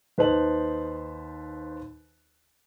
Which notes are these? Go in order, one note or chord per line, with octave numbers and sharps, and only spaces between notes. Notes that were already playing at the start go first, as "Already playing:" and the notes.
D#2 B4 C5 D#5 A5 F#7